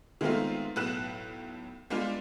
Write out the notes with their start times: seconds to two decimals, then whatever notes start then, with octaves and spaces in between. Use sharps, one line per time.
0.21 D#3 G#3 A3 B3 C4 F4
0.76 B1 A2 B4 F#6 E7
1.90 G3 G#3 B3 D4 F4